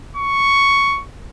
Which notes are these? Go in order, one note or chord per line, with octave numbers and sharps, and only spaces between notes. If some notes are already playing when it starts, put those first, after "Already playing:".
C#6